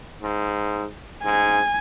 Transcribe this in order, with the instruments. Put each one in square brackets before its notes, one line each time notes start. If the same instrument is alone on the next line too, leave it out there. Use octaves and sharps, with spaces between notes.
[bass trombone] G#2
[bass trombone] G#2 [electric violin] G#5